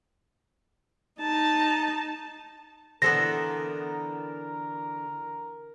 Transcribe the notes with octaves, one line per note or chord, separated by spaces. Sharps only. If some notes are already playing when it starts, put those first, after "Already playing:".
D#4 A5
D3 E3 B3 A4 A#4 C5 A#6